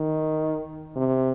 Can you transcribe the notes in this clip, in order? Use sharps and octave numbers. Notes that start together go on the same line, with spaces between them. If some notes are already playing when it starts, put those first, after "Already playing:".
Already playing: D#3
C3